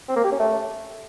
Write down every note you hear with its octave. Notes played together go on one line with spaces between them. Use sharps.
C4
A#3
G4
C#4
A3